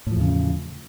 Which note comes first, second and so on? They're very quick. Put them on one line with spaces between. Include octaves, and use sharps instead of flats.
A2 F3 E2 C#3